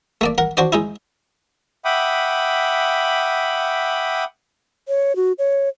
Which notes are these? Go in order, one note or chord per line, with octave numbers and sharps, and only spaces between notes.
A3 A#3 D5
A#4 F#5
D4 F#4 C5 D5
G#3 D#4 E4
E5 F#5 G5 B5 D6 D#6
C#5
F#4
C#5